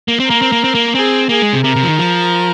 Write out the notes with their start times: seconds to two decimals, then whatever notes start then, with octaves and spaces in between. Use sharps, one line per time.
0.08 A#3
0.20 C4
0.25 A#4
0.30 A#3
0.42 C4
0.52 A#3
0.64 C4
0.75 A#3
0.95 C4 G#4
1.29 A#3 G#4
1.42 G#3
1.53 C3
1.64 C3 A#4
1.76 C3
1.83 F3
1.88 D#3
1.99 F3